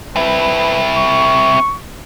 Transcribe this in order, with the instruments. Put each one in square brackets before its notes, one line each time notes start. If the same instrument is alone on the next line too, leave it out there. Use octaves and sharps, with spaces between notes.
[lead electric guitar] C4 E4 [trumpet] B4
[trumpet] C#6